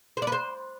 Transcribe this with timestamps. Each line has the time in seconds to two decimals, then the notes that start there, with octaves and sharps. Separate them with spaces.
0.17 C5
0.22 D5
0.27 B4
0.32 C5